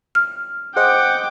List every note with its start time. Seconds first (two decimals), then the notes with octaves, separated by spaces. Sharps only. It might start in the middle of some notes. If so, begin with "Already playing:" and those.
0.15 F6
0.76 G#4 C5 D#5 F#5 G5 D6